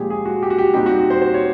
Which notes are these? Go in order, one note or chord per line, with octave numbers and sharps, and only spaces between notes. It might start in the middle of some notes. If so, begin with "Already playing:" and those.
Already playing: A#2 F3 G#3 G4 G#4
G#4
F#4
G4
F#4
G4
A#2 G3 C4 D#4 G4
F#4
G4
C5
C5
C#5